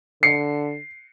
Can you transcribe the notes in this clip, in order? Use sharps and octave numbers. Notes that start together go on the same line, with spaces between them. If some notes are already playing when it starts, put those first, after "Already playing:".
D3 C7 C#7